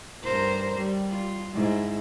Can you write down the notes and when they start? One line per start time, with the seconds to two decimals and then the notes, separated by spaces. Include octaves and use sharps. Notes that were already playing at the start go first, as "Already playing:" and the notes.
0.23 G2 A#4 C5
0.76 G3
1.10 F4
1.53 G#2 E4